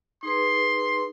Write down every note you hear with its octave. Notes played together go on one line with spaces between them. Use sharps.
D#4 G#4 B4 C6